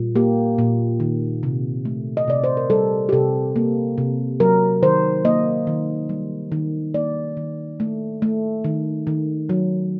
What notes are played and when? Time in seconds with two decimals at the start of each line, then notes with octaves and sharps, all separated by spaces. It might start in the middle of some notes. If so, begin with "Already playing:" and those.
Already playing: A#2 G3
0.16 A#3 G4
0.58 A#2
1.00 D#3
1.43 C3
1.85 A3
2.17 D#5
2.28 C3 D5
2.44 C5
2.57 A#4
2.70 G3 A4
3.09 G4
3.13 C3 A4
3.56 A#3
3.98 C3
4.40 F#3 A#4
4.83 D#3 C5
5.25 A#3 D#5
5.67 D#3
6.09 G3
6.52 D#3
6.94 A#3 D5
7.37 D#3
7.80 A3
8.22 A3
8.64 D#3
9.07 D#3
9.49 F#3